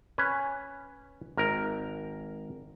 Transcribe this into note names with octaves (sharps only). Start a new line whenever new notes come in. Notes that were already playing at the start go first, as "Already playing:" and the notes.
C#4 B4 G#5
G#1 A#4